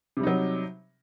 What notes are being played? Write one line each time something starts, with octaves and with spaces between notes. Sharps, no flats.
C3 F#3 G3 D#4